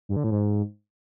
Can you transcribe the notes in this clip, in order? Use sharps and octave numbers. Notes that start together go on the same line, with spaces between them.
G2
D3
A2
G#2